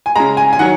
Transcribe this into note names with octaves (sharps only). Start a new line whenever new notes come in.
G#5
C#3 G#3 A#5
G#5
G#5
D#3 F#3 F#5